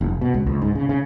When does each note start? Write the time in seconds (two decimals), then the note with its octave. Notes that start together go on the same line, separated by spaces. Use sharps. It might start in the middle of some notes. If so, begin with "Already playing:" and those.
0.01 F1
0.21 B2
0.34 C#2
0.46 C#2
0.62 G#2
0.75 C#3
0.89 C#3